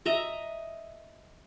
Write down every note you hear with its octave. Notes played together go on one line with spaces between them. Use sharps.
D#5 E5 A#5